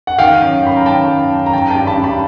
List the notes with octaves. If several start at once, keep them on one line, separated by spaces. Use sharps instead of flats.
F#5
D#3 F5 G5
F#2
F#2 B5
A#5
D#3 G5 A5
F#2
F#2
A#5
D#3 G5 A5
G2 G5 A5
A5 B5
G2
A5 B5